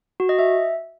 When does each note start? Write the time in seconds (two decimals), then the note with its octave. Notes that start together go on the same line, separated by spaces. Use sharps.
0.20 F#4
0.29 D#5
0.39 E5